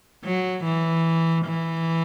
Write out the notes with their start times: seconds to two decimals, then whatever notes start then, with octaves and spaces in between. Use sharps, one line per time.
0.24 F#3
0.64 E3
1.45 E3